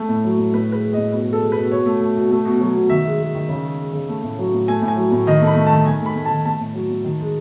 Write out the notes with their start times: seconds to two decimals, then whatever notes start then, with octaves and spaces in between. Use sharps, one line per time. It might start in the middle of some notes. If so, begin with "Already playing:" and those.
Already playing: A3
0.09 A2
0.24 F#3
0.38 A2
0.53 A2 B4
0.68 G#3 B4
0.83 G#3
0.93 A2 D#5
1.12 B2 B4
1.28 G#3 A4
1.42 G#3
1.52 B4
1.57 B2
1.71 B2 C#5
1.86 A3
2.01 A3
2.17 B2
2.31 A3
2.45 B2
2.61 F#3
2.75 B2
2.89 D#3 E5
3.04 G#3
3.19 G#3
3.35 D#3
3.49 C#3
3.64 G#3
3.79 G#3
3.93 C#3
4.09 A3
4.23 A2
4.39 F#3
4.53 A2
4.68 A3 G#5
4.82 A2
4.88 G#5
4.97 F#3
5.12 A2
5.27 D#3 D#5
5.42 A3
5.47 B5
5.56 A3
5.67 D#3 A5
5.86 D#3 G#5
6.01 A3
6.06 B5
6.16 A3
6.25 D#3 A5
6.45 A3 A5
6.61 A2
6.74 F#3
6.90 A2
7.04 D#3
7.20 G#3